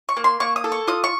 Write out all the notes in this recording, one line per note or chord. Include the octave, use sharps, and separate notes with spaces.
C#6
A#3
C6
A#3 C#6
D#6
A4
C#6
F4 D#6
C#6